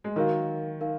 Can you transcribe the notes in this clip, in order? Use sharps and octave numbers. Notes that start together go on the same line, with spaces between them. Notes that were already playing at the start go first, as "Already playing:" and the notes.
G#3
D#3 F#3 D#4 A#4 F5
D#4 A#4 F5